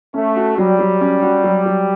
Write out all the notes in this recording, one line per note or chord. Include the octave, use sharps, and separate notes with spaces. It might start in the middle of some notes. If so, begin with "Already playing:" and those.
A3 C#4
F#4
F#3 G3
F#3
C#4
F#4
F#3
F#3